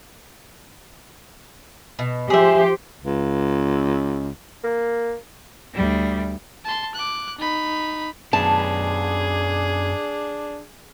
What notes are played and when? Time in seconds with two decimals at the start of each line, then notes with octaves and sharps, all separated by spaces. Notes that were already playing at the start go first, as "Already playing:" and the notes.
1.99 B2
2.30 F3 G4 G#4 C5 E5
3.03 C#2
4.63 A#3
5.74 D2 G3
6.64 A5 C6
6.95 D6 F#6
7.39 D#4 B5
8.33 F#2 B3 D4 G#4 A5